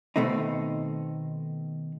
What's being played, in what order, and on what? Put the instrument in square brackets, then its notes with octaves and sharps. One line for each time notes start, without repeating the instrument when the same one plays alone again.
[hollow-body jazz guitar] B2 D#3 A3 C4 D#4